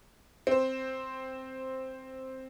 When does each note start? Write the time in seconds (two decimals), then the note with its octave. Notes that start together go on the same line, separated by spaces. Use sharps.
0.47 C4 C5